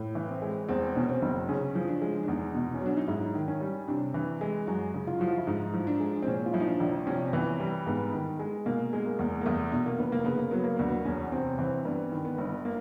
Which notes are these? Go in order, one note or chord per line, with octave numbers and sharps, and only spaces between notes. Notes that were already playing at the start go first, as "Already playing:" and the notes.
Already playing: A2
E3
C4
G#3
E2 C4
B2 C#4
C4
F#1
C#3 C#4
F3
D4
G#3
D4
E2 D#4
B2
C#4
F#3 D4
D#4
G#2 E4
D#3
C#4
G3
C3 D4
E3
G#3
F#2 F#4
C#3
F4
F3 F#4
F4
E4
G#2 D#4
F3
D4
G#3
C4
A#2 C#4
F4
F3 E4
D#4
D4
A#1
C3 C#4
E3 B3
G3
G#2 B3
D#3
G#3
B2 A#3
G#3
A#3
E2
A#3
E2 A3
B2
A#3
F1 B3
A#3
C#3 B3
A#3
F#3 B3
A#3
D2 B3
A#3
E2 C#4
C3 C4
E3 C4
G2 B3
D#3
B3
G1
A#3